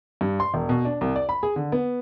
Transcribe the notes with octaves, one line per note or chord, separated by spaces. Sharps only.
G2
C6
E1
B2
D4
C2
D5
B5
G#4
D3
B3